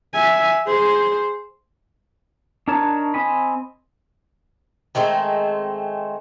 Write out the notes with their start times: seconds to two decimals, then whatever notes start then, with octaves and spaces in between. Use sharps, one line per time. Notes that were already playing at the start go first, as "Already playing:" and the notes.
0.14 E5 G#5
0.67 G#4 C5
2.68 D4 D#4 A#4 C#5 A5
3.14 C4 D#5 G#5 B5
4.95 D#3 G#3 A3 C4